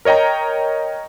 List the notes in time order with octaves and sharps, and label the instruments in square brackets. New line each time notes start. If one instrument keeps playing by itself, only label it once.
[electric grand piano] A#4 C#5 D#5 G5 A#5